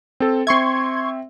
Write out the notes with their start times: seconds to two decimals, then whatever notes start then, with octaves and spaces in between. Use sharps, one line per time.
0.20 C4 A4
0.47 C4 E5 C6 C#6 G#6